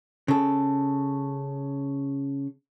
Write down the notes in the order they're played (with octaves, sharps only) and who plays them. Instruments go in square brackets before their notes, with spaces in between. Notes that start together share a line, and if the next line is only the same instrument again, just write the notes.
[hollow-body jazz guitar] C#3 A4